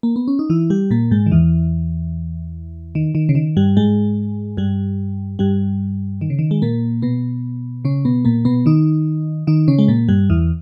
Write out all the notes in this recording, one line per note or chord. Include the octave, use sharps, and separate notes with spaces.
A#3
B3
C#4
D#4
E3 E4
G3 G4
A#2 A#3
G#2 G#3
D#3
E2 E3
D#3
D#3
C#3
D#3
G2 G3
G#2 G#3
G2 G3
G2 G3
D#3
C#3
D#3
G#3
A#2 A#3
B2 B3
C#3 C#4
B2 B3
A#2 A#3
B2 B3
D#3 D#4
D#3 D#4
C#3 C#4
G#3
A#2 A#3
G2 G3
E2 E3